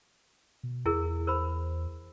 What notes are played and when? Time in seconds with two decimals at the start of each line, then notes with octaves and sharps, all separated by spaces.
0.63 B2
0.86 E2 E4 G#4 A#4
1.27 A#4 C5 B5